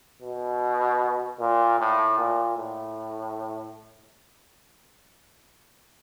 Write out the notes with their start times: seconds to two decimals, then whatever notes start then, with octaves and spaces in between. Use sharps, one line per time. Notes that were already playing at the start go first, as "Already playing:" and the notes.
0.22 B2
1.40 A#2
1.79 A2
2.18 A#2
2.57 A2